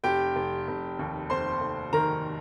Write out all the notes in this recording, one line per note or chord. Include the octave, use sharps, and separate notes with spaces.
F1 G4 G5
F1
F1
D#2
F1 C5 C6
F1
D#3 A#4 A#5